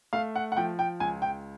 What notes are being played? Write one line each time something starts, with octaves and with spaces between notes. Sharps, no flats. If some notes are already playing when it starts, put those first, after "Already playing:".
A3 F5
F#5
F#5
F3 G5
G5
C#2 G#5
G5